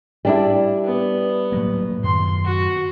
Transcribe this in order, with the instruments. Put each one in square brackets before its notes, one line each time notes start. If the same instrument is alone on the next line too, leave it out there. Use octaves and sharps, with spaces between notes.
[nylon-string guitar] G3 D4 E4
[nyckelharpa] B3
[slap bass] A2 F#3 A#3
[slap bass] F#2 D#3 [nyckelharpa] C6
[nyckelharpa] F#4